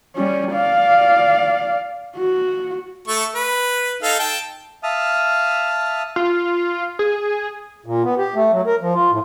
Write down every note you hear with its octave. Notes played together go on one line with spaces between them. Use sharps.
G3 C#4
D5 F5
F#4
A3 A4 C#6
B4
D#4 A4 F5
G5 A5
E5 F5 A5 D#6 F6
F4
G#4
A#2
B3
G4
A3
F#3
A#4
F3
F4
A2